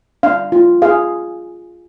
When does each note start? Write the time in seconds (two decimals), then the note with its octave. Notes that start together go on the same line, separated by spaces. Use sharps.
0.23 D4 F5
0.52 F4
0.82 G#4 F5